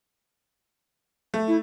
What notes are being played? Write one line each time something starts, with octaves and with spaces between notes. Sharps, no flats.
A3
E4